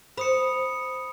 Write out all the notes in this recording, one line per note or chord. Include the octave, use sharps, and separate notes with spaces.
C5 B5 D#6 C#7